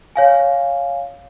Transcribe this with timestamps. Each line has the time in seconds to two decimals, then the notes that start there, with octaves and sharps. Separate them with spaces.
0.16 C#5 F5 G#5